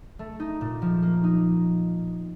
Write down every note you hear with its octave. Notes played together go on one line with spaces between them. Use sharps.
A3
D#4
A#2
F3
A#3
D#4